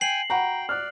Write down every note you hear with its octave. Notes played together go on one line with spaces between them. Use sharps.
G5 G#5 C7 F#7
F#4 F#5 G5 A#5 B5
D5 F6 F#6